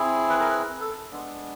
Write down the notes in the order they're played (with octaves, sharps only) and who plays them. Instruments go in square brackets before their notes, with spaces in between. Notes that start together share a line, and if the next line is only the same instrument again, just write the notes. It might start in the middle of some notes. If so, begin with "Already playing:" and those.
Already playing: [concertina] C4 E4 G#4
B4
A#4
B4
A4
G#3 B3 D4